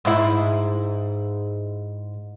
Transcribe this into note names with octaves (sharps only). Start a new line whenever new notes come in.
G#2 E4